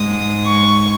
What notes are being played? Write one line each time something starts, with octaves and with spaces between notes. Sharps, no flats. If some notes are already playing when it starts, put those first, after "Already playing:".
Already playing: G#2 G#3 D#6
C#6